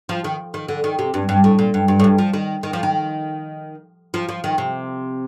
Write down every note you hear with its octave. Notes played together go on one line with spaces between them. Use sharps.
F3
D#3
D#3
D3
D#3
C3
G2
G2
A2
A#2
G2
G2
A2
G2
F3
D#3
D#3
F3
D#3
F3
F3
D#3
C3